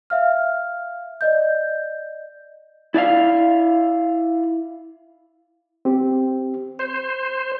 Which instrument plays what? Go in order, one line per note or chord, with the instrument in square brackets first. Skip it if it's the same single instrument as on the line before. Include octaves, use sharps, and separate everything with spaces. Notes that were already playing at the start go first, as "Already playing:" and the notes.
[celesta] E5 F5 F6
D5 D#5 G6
[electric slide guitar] E4 D5 E5 F5
[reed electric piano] C4 G4
[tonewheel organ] C5